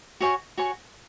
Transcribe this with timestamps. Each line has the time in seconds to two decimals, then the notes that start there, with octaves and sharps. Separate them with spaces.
0.21 F#4 C#5 G#5 C#6
0.57 F#4 C#5 G#5 C#6